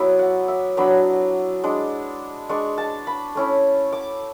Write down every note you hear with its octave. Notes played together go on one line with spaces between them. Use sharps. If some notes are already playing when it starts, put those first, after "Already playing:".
Already playing: F#3 B3 E4 D5 E5
F#5
E5
F#3 B3 D4 B5
G#3 D4
G#3 D4 C#6
A5
B5
A3 C#4 E4
D6